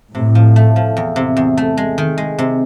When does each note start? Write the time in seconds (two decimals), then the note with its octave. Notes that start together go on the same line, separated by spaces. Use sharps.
0.14 A2 C3
0.35 F3
0.56 A3
0.76 F3
0.97 E2
1.16 C3
1.37 E2
1.57 A3
1.77 G#3
1.98 D#3
2.18 G#3
2.38 C3